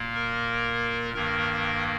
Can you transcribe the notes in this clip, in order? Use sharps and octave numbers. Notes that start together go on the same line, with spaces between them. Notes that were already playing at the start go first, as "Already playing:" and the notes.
Already playing: A#2 A#3
A#4
G2 D#3 A#3 A#4